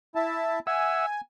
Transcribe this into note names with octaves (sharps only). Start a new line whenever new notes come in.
E4 E5 A5
E5 F#5 G#5 E6